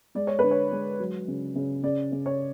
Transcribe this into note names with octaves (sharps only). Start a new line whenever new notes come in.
G#3 D5
C#5
D3 B4
C#5
G#3
F#3
C#3
C#3
C#3 D5
C#3
C#5